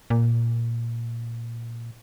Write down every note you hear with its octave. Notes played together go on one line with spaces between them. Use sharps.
A#2